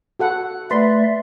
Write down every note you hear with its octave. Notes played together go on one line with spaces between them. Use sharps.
F#4 A4 F#5
A3 B4 D5 E5 C6